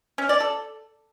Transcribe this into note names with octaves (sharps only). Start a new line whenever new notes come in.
C#4
D5
A4